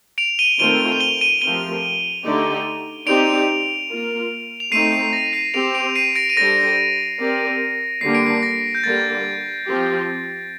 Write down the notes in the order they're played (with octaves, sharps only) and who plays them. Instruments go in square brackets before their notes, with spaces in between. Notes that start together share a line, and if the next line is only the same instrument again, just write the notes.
[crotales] D7 F7
D#7 G7
[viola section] D#3 A3 C4 F4 C5 [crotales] D#7 G7
[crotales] F7
D#7 G7
D#7 G7
[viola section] F3 A3 C4 G4 A#4 [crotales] D#7 G7
[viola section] D3 A3 D#4 G4 D5
[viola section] C4 D#4 G4 D5 [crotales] D7 F7
[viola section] A#3 F4 A#4
[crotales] F7
[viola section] A3 C4 D#4 [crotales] C7 D#7
[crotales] C7
A#6
C7 D#7
[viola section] C4 G4 C5 [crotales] D7 F7
[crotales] D7 F7
C7 D#7
A#6 D7
D#7
[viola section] G3 D4 A4 C5 [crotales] A#6 D7
[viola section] C4 G4 A#4 D5
[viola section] D3 G3 A#3 D4 [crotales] C7
[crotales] D7
C7
A#6
G6
[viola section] D3 G3 A#3 [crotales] A6
[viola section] F3 C4 G4